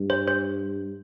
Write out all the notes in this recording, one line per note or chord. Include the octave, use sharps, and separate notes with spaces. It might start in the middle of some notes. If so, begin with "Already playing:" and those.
Already playing: G2
C5
C5